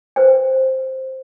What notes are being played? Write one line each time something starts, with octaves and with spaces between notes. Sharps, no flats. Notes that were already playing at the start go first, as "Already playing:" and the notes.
B4 C5 G5